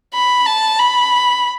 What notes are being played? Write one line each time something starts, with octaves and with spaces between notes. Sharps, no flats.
B5
A5
B5